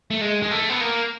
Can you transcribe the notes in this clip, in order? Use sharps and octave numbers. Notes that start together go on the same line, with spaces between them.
A3
G#3
G#3
A3
B3
A#3